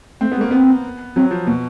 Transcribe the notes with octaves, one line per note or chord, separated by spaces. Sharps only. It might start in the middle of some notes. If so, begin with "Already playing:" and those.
A3 C4
B3
G#3
A#3
B3 C4
F#3 C4
F3
B2 A#3